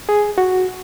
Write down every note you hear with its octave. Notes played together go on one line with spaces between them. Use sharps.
G#4
F#4